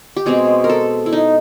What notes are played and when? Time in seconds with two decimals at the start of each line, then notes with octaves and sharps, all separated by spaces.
0.17 G4
0.26 B2 G#3 C4 G#4
0.64 A#4
0.69 A4
1.06 E4
1.12 D#4